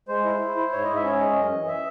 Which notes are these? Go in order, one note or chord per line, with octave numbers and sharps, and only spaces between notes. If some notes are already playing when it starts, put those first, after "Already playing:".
G#3 C5
E4
E4
E4
G#2 C#5
G#2 D#5
E5
C#4 C#5
G#3 D#5
F#2
E3
E5